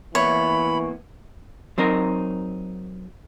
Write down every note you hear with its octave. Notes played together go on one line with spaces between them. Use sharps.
E3 A#3 B3 E4 C#5 B5
F#3 C4 D#4 A#4